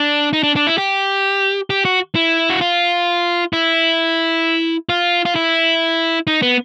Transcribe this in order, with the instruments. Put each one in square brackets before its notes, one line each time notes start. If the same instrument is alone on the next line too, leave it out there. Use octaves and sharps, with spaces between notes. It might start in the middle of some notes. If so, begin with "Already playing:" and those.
Already playing: [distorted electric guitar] D4
D#4
D4
D4
E4
G4
G4
F#4
E4
F#4
F4
E4
F4
F4
E4
D#4
B3